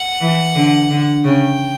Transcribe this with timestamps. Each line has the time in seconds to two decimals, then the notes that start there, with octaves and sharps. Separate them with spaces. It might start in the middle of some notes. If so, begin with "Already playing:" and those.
Already playing: F#5
0.21 E3
0.56 D3
0.90 D3
1.25 C#3 G5